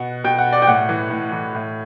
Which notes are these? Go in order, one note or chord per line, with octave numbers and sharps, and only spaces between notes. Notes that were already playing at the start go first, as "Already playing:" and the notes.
Already playing: B2 F#5
B2 G5
F#5
D5
G5
A2 F#5
E3
A2
E3
A2